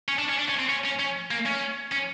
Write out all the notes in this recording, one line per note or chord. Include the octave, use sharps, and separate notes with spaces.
C#4
D4
C#4
D4
C#4
C4
C#4
C#4
C#4
A#3
C#4
C#4